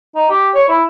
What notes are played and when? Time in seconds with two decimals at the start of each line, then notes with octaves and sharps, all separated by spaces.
0.15 D#4
0.30 G4
0.55 C#5
0.69 E4